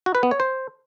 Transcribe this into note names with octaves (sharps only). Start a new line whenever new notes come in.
F#4
B4
B3
C#5
C5